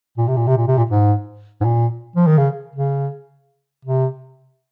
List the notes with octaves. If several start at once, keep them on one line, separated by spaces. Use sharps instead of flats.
A#2
C3
A#2
C3
A#2
C3
A#2
G#2
G#2
A#2
F3
D#3
C#3
C#3
C3